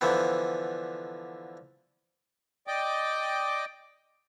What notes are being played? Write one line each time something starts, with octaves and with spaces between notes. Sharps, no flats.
D3 E3 F3 B3
D5 D#5 G5 D6